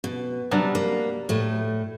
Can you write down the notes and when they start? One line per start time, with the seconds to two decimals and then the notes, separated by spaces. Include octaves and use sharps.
0.04 B2
0.51 C3 F#3 G3 D4
0.75 A#3
1.29 A2 A3